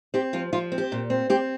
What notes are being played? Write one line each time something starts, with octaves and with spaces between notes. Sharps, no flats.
C4 G4
F3 F4
F3 F4
C4
G4
A#2
C4
C4 G4